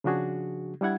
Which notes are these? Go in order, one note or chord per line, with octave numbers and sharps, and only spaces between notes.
C#3 F3 D4 F#4 G#4
G3 D4 E4 F#5 G#6